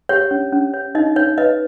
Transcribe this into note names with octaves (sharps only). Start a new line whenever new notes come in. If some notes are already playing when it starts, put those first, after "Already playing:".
G4 C#5
C#4
C#4
C#5
D#4 D#5
D#4 C#5
B4 D#5